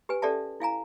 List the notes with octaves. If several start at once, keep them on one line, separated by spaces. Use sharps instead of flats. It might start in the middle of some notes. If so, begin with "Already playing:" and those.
G4 B4 G#5
C#4 G4 A4 D5 E5 A5
E4 F5 G#5 A#5